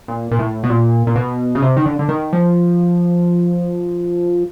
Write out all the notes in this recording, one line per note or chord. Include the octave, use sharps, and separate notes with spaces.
A#2
A#2
A2
B2
A#2
A#2
B2
C#3
C3
D#3
D3
D3
D#3
F3